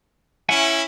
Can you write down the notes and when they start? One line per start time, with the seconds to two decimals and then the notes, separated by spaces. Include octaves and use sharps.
0.49 C#4 E4 E5 F#5 G#5